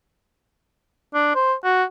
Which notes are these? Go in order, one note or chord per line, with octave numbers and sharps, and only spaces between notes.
D4
C5
F#4